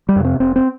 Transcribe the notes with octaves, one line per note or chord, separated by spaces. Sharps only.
G3
F2 C3
C4
F1 C4
C4